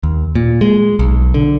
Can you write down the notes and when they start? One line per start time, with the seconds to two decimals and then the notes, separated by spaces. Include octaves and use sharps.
0.03 D#2
0.35 A#2
0.61 G#3
0.99 B1
1.34 D3